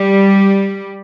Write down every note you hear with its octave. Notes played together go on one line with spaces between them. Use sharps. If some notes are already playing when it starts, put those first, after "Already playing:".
Already playing: G3